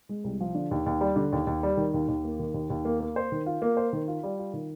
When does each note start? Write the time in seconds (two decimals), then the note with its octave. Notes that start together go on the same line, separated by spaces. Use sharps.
0.09 G#3
0.24 C2
0.40 F3
0.55 D3
0.71 D#2
0.86 D#2
1.01 G3
1.16 D3
1.32 D#2
1.47 D#2
1.63 G3
1.77 D#3
1.94 D#2
2.08 D#2
2.24 A#3
2.39 D#3
2.54 D#2
2.70 D#2
2.85 A#3
3.00 A#3
3.16 C5
3.32 D#3
3.46 F4
3.62 A#3
3.77 C5
3.93 D#3
4.08 F4
4.23 G3
4.39 F4
4.54 D#3